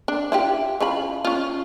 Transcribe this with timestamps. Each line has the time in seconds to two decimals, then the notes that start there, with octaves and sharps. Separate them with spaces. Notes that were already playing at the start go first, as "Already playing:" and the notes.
0.08 D4
0.32 E4 F4 G4
0.80 C#3 F4 B5
1.25 C#4 F4